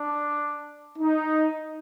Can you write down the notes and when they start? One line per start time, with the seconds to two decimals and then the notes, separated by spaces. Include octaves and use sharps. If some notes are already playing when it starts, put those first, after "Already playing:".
Already playing: D4
0.98 D#4